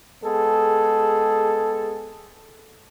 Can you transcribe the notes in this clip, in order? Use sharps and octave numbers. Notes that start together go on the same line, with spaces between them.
G#3 B3 G#4 A4